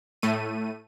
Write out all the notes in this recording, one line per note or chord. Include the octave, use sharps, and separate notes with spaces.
A2 A3 D#7